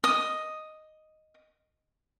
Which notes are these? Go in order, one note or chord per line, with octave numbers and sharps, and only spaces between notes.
D#5 D#6